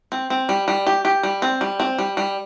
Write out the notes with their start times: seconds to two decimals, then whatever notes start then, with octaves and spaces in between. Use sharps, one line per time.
0.12 C4
0.30 C4
0.49 G3
0.68 G3
0.87 G4
1.05 G4
1.23 G3
1.42 C4
1.61 G3
1.80 C4
1.99 G3
2.17 G3